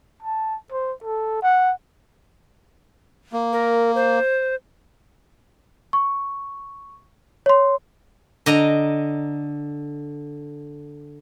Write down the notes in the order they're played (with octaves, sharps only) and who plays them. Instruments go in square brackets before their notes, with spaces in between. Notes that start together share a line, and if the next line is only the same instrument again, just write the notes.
[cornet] A5
C5
A4
F#5
[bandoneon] A#3
[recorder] A#4
C5
[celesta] C#6
C#5 C6
[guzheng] D3 D#5 A#5